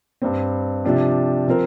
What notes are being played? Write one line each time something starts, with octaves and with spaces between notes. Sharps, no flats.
G2 G3 C4
C3 F3 D4 G4
F3 C4 A#4